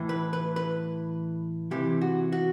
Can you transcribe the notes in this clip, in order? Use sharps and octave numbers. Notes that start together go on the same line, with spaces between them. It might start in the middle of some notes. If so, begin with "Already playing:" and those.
Already playing: A2 E3
B4
B4
B4
C3 E3 G4
F#4
F#4